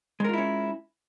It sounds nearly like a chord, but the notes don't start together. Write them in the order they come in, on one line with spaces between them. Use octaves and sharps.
G#3 A#4 F4 E4 C#4